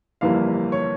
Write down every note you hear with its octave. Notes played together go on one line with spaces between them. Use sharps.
G1 F2 E3 G3 A#3 F5
C#5